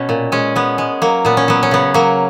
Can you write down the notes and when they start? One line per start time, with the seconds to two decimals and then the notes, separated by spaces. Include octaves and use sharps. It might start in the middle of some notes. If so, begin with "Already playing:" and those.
Already playing: B2 C#4
0.09 A#2
0.32 G#3 C#4
0.56 G#3 B3
0.78 G#3
1.02 F#3 A#3
1.25 A#2 B3
1.37 C#4
1.48 F#3 B3
1.63 C#4
1.71 C#3 B3
1.94 F#3 A#3